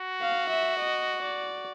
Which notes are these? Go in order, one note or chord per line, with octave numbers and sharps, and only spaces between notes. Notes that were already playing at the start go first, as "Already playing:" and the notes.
Already playing: F#4
F5
E5
D#5
D5